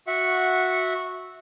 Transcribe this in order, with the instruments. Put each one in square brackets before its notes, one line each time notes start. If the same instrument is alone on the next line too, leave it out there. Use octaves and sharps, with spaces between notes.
[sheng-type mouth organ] F#4 E5 F#5 C#6